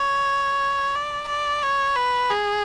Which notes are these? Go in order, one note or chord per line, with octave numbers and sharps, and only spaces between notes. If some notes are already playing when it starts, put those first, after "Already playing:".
Already playing: C#5
D5
D5
C#5
B4
G#4